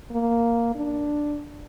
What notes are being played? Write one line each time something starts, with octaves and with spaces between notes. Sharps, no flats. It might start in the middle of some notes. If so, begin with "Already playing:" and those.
A#3
D4